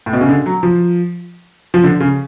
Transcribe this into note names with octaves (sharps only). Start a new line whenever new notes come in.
A2
B2
C#3
D3
F#3
F3
F3
D3
C#3